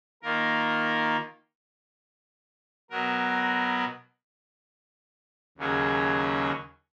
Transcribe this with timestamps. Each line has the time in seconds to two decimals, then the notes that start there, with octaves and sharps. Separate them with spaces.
0.23 D#3 A#3 F4 A#4
2.90 B2 F#3 B3 F#4 A#4
5.58 D#2 C#3 F#3 C#4 G#4